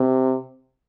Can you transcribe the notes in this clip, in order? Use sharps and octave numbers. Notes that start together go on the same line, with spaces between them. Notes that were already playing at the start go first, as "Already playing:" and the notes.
Already playing: C3